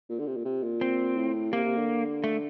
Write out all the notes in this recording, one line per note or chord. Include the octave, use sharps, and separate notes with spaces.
A#2
D3
C3
A#2
C3
A#2
C4
A2
C3 A#3
C3
D3
A3